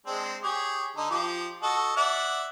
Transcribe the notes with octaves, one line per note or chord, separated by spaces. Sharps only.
G#3 C4 D4
G4 G#4 C#5
D3 D#4
F3 G4
F#4 A4 D#5
D5 E5 F#5